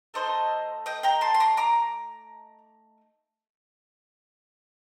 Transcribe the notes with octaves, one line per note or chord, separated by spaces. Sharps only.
A3 D#4 A4 C5 D#5
D#5 G5
G5 A#5
A5 C6
C6
A#5 D6
A#5 D6